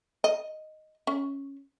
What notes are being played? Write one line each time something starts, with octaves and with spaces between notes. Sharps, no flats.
D#5
C#4